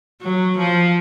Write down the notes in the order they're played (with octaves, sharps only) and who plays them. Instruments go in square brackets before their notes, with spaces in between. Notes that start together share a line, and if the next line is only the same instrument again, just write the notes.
[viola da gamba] F#3
F3